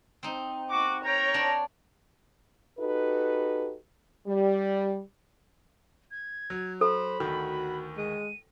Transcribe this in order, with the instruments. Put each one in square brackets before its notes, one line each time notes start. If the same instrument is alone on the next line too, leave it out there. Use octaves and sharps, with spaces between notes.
[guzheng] C4 D#4
[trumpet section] F#4 [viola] D6
[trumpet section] A#4 G5 A#5 [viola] C#5
[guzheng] D4 D5
[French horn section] D#4 F#4 G4 A4 B4
G3
[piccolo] G#6
[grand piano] F#3
[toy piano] A4 [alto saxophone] C5 [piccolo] B5
[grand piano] D2 D#3 [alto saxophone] F#4
[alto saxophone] G#3 [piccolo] D#7